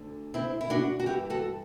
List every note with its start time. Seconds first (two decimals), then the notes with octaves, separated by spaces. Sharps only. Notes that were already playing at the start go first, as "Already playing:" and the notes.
Already playing: D2 D3
0.34 C4 E4
0.61 E4
0.70 D4 F#4
0.99 F#4
1.06 G2 E3 E4 G4
1.30 F#4 A4